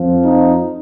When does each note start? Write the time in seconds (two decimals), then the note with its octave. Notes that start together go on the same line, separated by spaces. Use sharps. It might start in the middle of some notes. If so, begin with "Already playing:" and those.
Already playing: F2 F3
0.23 D#4